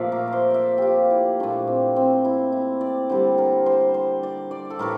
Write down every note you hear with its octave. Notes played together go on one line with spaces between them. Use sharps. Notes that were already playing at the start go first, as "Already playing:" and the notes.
Already playing: A#2 F3 A3 D5 E5 F5
A#4
A#4 C5
D5 E5
F4 G4
E4
A#2 A3 D4
C4
C4
E4
E4
D5
D3 G3 C5
A#4
C5
C5
D5
D5
A4
A2 E3 A3 A#4